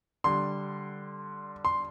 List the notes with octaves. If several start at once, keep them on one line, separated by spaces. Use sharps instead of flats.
D3 G3 C6
C6